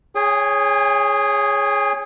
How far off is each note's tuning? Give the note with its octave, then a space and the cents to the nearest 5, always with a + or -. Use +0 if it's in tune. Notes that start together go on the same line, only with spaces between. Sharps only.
G#4 +0 C#5 +0 G#5 -45